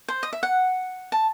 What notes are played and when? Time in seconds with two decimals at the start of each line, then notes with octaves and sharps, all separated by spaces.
0.08 C5
0.23 D#5
0.33 E5
0.43 F#5
1.12 A5